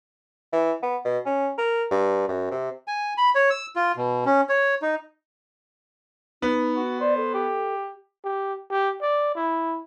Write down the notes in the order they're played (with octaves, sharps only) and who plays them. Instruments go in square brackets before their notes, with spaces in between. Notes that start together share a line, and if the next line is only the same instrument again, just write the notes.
[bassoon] E3
B3
B2
C#4
A#4
G2
F#2
C3
[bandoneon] G#5
B5
C#5
E6
F4
B2
C#4
C#5
D#4
[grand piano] B3 [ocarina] D#4
[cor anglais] F#4
[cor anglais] C5 [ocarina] D5
[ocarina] A4
[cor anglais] G4
[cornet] G4
G4
D5
E4